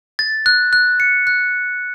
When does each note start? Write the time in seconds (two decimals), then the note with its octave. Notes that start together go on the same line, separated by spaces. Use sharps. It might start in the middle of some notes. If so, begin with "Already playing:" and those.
0.19 A6
0.46 F#6
0.73 F#6
1.00 C#7
1.27 F#6